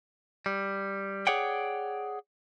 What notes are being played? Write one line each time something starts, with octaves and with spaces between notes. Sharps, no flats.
G3
G#4 C#5 D5 F#5 G5